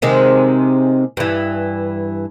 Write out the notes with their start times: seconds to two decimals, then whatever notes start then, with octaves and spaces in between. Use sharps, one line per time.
0.02 C3 D#3 G#3
1.17 G2 E3